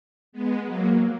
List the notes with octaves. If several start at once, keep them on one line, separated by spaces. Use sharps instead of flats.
G#3 B3
F#3 A#3